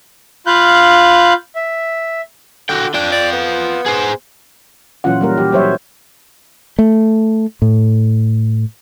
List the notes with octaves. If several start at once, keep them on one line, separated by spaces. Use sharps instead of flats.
F4 F5 B5 F#6 G6
E5
D3 F#4 G5
D4 F4 G5
D5
B3
G#4 C5
A#2 E3 F#3 C#4 F4 F#5
G3 A#3 A#4
E3 G4
F#3 G3 C5 C#5 E5
A3
A2